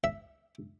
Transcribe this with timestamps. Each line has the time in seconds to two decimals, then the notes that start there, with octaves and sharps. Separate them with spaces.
0.04 E5